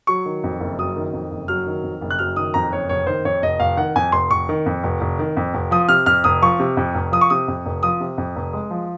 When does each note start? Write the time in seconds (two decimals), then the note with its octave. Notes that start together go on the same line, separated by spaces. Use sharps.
0.07 F#3 C#6
0.26 D#3
0.44 F2
0.60 F#1
0.78 F#3 D#6
0.97 D#3
1.13 F2
1.31 F#1
1.48 F#3 F6
1.67 D#3
1.83 F2
2.01 F#1
2.11 F#6
2.19 F#3 F6
2.36 D#3 D#6
2.54 F2 A#5
2.71 F#1 C#5
2.89 F1 C#5
3.07 D#3 C5
3.25 F2 C#5
3.42 F1 D#5
3.60 F1 F5
3.77 D#3 F#5
3.96 F2 G#5
4.12 F1 C6
4.30 F1 C#6
4.49 D#3
4.66 F2
4.83 F1
5.01 F1
5.19 D#3
5.37 F2
5.54 F1
5.71 F3 D#6
5.89 C3 F6
6.06 F2 F6
6.24 F1 D#6
6.42 F3 C#6
6.60 C3
6.77 F2
6.95 F1
7.12 F3 D#6
7.21 C#6
7.30 C3 D#6
7.48 F2
7.65 F1
7.83 F3 D#6
8.00 C3
8.18 F2
8.36 F1
8.53 G#3
8.71 F3